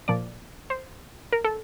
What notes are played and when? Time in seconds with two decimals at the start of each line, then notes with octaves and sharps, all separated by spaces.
0.08 A#2 F3 D5
0.70 C5
1.33 A#4
1.44 A4